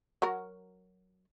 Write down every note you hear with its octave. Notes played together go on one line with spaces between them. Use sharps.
F#3 F#4 A#4